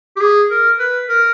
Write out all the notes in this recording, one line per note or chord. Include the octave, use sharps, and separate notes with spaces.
G4
G#4
A#4
B4
A#4